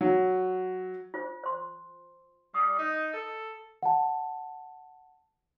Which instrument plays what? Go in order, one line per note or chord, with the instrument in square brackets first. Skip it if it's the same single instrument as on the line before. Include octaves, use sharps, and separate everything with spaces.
[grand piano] F#3
[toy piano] F4 C5
C5 C6
[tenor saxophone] G3 [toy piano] D#6
[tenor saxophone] D#4
A4
[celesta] F#5 A5